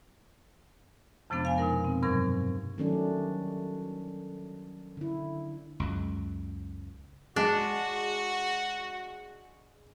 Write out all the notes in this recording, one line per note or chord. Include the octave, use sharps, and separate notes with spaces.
F2 C3 F3 G#3 B3 D4
F5 G#5
B2 G#3 D#4 A#4
C4
G2 C3 F#3 A#4 C#6 G#6
D#3 F#3 G3 A3 C#4 D4
D3 E4
C#2 F#2
G#3 D4 F#4